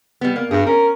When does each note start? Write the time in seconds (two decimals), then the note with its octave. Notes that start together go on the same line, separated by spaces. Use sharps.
0.21 G3 B3
0.36 A#3
0.51 G2 F#4 G#4
0.66 C#4 A#4